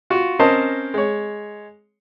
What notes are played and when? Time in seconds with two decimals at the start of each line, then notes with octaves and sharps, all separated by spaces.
0.10 F4 F#4
0.39 C4 C#4 A#4 C5 D#5 A5
0.94 G#3 C#5